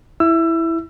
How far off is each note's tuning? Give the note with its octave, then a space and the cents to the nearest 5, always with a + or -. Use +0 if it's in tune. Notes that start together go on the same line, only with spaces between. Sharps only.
E4 +0 E6 +25